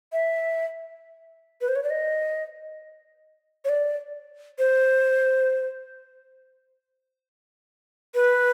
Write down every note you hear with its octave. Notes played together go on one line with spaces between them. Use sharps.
E5
B4
C5
C#5
D5
D#5
C#5
D5
C5
B4